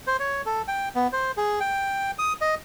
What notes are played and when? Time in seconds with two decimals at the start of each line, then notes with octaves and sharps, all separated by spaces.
0.07 C5
0.20 C#5
0.46 A4
0.68 G5
0.95 B3
1.13 C5
1.37 G#4
1.60 G5
2.19 D#6
2.41 D#5